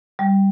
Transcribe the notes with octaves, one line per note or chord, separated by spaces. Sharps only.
G3